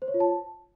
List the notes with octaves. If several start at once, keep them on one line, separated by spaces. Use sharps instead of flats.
C5
C#5
F4
A5